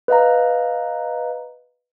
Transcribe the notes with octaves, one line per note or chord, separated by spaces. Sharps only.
B4 D#5 F5 A#5